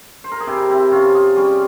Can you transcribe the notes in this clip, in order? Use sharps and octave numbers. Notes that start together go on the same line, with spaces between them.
C5
A#4
G#4
C3 E4 G4
C4 E4
C3 C#4 F4
F4 G#4
G3 C#4 F4